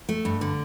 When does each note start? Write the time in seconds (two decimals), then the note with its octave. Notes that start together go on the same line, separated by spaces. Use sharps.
0.09 A3
0.25 G2
0.41 D3